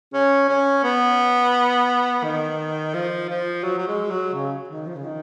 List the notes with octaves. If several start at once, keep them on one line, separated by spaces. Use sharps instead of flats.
C#4
C#4
B3
D#3
F3
F3
F#3
F#3
G#3
F#3
C#3
D#3
F3
C#3
D#3